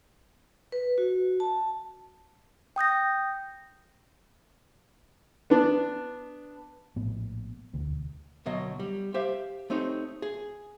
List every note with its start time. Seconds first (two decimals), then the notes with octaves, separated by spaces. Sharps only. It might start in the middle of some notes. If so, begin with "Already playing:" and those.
0.72 B4
0.98 F#4
1.40 A5
2.76 G5 D#6 G6 A#6
5.50 B3 D4
6.96 A#1 A2 B3
7.73 E1 D2
8.46 D2 B2 F#3 D#5
8.80 G3
9.14 G4 C5 E5 F5
9.70 A3 C4 D#4 G4 C#5
10.22 G#4